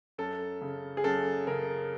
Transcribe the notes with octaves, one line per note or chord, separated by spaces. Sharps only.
F#2 A4
C#3
G#4
F#2 A4
C#3 A#4